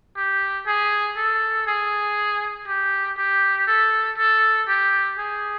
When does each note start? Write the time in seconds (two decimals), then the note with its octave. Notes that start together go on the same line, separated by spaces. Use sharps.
0.17 G4
0.67 G#4
1.17 A4
1.67 G#4
2.67 G4
3.18 G4
3.67 A4
4.18 A4
4.68 G4
5.18 G#4